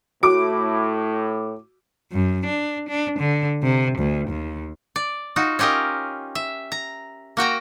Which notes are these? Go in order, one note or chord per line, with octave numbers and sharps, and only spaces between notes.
A2 F#4 D6 D7
F#2
D4
D4
D3
C3
D2
D#2
D5
D#4 F4 F#4
C#4 F4 G4 A#4 D#5
E5
A#5
A#3 F#4 G5 A#5